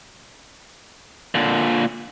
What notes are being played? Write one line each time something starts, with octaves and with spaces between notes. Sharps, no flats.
A#2 D3